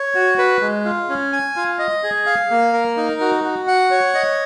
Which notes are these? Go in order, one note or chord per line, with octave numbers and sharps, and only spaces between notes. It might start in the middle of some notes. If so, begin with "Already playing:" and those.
Already playing: C#5
F#4
B4
G#3
F4
C#4
G#5
F4
D#5
G#4
F5
A#3
A#4
D#4
F#4
F#4
F#5
C#5
D#5